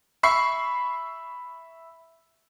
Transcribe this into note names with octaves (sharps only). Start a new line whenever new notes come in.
E5 B5 C#6 C7